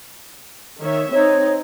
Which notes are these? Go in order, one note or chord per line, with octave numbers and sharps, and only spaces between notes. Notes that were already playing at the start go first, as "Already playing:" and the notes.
D#3 C#5 E5
C4 D#4 C#5